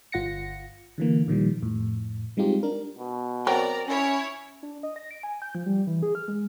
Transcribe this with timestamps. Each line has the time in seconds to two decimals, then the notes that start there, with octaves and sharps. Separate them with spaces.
0.12 G1 F4 F#5 A#6 C#7
0.98 D3 E3 A#3
1.28 A#2 D#3 F3 G3
1.62 F2 A2
2.37 G3 G#3 C4 D#4 F4 G4
2.63 D4 A#4
2.98 B2
3.47 F#3 C4 A#4 D5 A#5
3.88 C#4 E4 C#5
4.63 D4
4.83 D#5
4.96 A#6
5.11 D7
5.23 G#5
5.42 G6
5.55 F3
5.66 G3
5.87 E3
6.03 G#4
6.15 F6
6.28 G#3